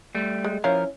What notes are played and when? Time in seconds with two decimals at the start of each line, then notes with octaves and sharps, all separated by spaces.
0.15 G3 A3
0.44 G#3
0.64 F3 C#4 E4 A#4 F5